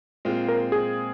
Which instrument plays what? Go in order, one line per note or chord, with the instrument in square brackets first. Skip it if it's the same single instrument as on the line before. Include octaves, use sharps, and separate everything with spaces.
[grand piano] A#2 G#3 C4 F4
[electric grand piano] A#4
G#4